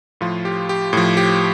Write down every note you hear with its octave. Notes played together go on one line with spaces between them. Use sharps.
A2 F3 F4
G4
G4
A2 F3
G4